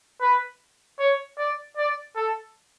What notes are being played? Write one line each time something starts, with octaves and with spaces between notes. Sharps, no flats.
B4
C#5
D5
D5
A4